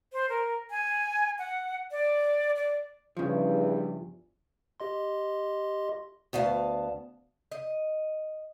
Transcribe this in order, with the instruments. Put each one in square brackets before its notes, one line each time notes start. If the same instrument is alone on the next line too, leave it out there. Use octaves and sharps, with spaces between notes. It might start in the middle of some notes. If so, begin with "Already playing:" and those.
[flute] C5
A#4
G#5
F#5
D5
D5
[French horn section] E2 G2 [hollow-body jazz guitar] C#3 F3
[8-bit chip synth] G4 D#5 C6
[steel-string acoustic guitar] D2 B3 F5 A5
[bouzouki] D#5